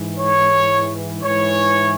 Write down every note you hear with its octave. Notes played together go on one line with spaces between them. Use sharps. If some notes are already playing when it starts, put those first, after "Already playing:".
Already playing: G#2 E3
C#5
G#2 E3 C#5